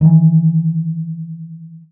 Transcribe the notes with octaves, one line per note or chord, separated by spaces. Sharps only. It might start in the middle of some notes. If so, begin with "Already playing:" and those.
D#3 E3